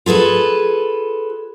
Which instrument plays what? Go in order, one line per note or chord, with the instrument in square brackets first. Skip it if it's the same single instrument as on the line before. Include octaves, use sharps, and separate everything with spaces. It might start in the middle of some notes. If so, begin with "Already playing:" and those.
[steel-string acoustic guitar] F4 G#4 A4 B4